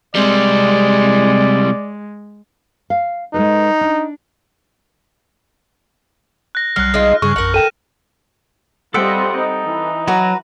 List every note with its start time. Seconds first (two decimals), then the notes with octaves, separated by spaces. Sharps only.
0.15 C3 G3 G#3 D5
2.90 F5
3.34 G#3 D#4 A4 B4
3.81 D4
6.55 F#6 A#6
6.76 B1 F#3 G3 F6 F#6 C7
6.94 G#3 D#4 F4
7.22 G2 C#3 G3 G#4 C#6
7.36 A#1 F#2 A#4 F#5
7.54 A4 G5 D#7 E7
8.94 G3 C4 F4 A4 D#5 E5 F#5 G5
9.36 D#4
9.65 E3
10.08 F#3 F#4 B4 A#5